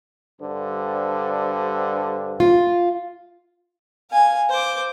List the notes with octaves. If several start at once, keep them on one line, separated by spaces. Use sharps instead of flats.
G2 D3 C5
F4
F5 G#5
C5 D6